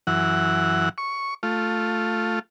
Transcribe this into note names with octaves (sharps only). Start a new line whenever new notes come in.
F#2 E3 F#5
C#6
A3 F4